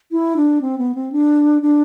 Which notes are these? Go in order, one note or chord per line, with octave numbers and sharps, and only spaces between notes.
E4
D4
C4
B3
C4
D4
D4